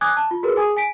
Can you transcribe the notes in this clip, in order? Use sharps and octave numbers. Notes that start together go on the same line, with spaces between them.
G#5 D6 D#6 F#6 G#6
A5
F4
F#4 G#4 A#4 B4
G#4 G#5 D#6
G#5 B6 D7